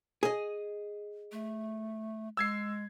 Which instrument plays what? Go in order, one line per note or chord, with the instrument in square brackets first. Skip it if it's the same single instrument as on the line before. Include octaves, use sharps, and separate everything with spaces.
[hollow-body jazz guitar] G#4 D#5
[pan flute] A3
[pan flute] G#3 [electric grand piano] E6 G#6 C7